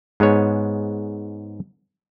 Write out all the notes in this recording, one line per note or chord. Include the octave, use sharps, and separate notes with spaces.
G#2 G#3 B3 C#5